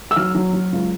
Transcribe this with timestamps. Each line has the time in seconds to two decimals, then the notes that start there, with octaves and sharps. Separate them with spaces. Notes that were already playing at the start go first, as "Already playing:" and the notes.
0.11 E6
0.16 F#3 F6
0.35 F#3
0.53 F#3
0.72 C#2